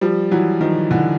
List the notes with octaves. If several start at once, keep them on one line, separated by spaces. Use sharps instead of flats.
F3 G3
E3 F#3
D#3 F3
D3 E3